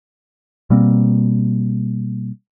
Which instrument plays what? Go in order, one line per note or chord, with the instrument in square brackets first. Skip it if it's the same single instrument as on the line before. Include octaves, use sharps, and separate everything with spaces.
[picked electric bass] B2 G3 A#3 C4